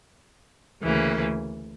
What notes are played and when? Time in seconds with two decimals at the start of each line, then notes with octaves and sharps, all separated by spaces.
0.83 D2 C#3 E3 A#3